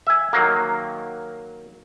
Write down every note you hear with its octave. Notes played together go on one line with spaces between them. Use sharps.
E5 G#5
D#3 F#3 A#3